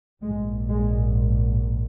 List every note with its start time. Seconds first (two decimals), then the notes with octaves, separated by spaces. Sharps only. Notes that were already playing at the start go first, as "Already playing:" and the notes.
0.22 A#1 G#2 G#3
0.69 G#3